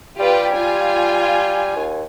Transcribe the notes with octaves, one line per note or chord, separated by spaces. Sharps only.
G3 F4 G4 B4
F4 G#5
D#2